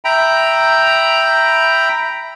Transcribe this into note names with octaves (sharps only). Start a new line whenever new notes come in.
E5 G5 A#5 B5